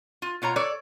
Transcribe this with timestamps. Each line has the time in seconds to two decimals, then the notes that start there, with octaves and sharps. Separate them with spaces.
0.22 F4
0.42 B2 F4 C#5 A#5
0.56 A4 C#5 D5